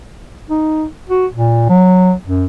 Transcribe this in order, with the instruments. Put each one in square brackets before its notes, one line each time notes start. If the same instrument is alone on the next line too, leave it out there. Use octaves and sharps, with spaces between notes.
[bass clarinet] D#4
F#4
A#2
F#3
F#2